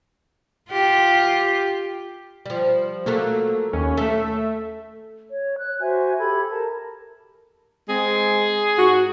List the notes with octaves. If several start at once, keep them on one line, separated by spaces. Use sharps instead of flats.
F4 G4
F3 G3
F#3 A3 A#3 A4
D#2 C#4
A3 A4 E5
C#5
F#6
F#4 C5 E5 G#5
G4 A4 B5 G#6
A#4 A5
G#3 C4 G#4
G#2 F#4